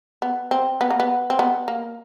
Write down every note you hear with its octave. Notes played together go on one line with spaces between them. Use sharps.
B3
C4
B3
A#3
B3
C4
B3
A#3